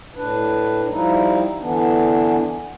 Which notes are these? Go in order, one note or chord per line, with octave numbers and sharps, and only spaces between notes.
A2 D4 B4
F3 G3 D#4 E4
D3 E3 B3 D4